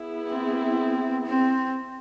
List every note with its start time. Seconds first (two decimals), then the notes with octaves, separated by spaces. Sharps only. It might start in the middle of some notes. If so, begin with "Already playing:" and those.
Already playing: B3 E4 G#4
0.29 C4
1.26 C4